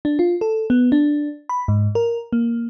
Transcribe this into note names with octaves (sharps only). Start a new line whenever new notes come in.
D4
F4
A4
B3
D4
B5
G#2
A#4
A#3